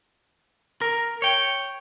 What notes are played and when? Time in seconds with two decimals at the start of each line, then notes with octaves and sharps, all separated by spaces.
0.81 A#4
1.22 C#5 G5